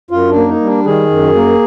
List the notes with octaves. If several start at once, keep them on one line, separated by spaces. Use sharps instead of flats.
F#2 F4
D4
A#3
D#4
G3
D4
D#3 G#4
F#2
A#3